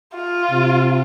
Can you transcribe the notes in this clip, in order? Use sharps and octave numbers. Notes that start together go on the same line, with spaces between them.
F4
C3